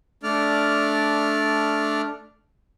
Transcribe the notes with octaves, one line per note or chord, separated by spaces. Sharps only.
A3 D4 D5 F6